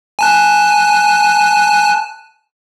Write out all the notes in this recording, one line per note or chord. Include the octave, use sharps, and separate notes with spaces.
G#5 A5 F#6